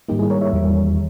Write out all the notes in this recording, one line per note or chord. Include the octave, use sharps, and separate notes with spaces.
G#2 D#3 G3 A#3 D#4 G4
E4 G#4
A#4 C#5
C#5 E5
E2 D#3 G3